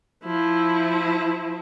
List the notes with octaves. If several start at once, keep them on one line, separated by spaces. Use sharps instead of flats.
F3 E4